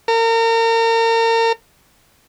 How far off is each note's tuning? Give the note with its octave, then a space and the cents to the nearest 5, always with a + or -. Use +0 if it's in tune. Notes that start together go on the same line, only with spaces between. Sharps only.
A#4 -35